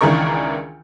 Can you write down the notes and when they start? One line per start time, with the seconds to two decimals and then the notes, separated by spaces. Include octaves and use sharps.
0.01 C#2 D#3 E3 D4 A#4 C#6